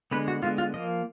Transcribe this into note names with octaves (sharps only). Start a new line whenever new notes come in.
D3 G#3 B3 B4
F#4
D3 G#3 B3 F4
F4
F3 A#3 D#5